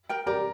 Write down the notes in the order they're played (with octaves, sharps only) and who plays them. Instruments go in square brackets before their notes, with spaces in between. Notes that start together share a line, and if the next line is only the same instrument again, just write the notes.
[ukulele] A#4 G5
[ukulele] G4 [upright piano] A#4 D5